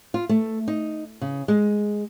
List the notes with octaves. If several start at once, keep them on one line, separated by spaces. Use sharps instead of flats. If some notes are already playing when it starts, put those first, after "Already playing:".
F4
A3
D#4
C#3
G#3